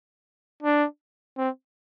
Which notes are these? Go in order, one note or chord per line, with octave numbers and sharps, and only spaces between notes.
D4
C4